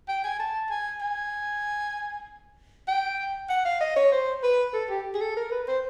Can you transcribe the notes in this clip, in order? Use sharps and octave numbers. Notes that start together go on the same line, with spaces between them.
G5
G#5
A5
G#5
G#5
G5
F#5
F5
D#5
C#5
C5
B4
A4
G4
G#4
A4
A#4
B4
C5